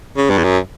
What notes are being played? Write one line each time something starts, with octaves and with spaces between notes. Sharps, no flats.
C#3
G2
E2
F#2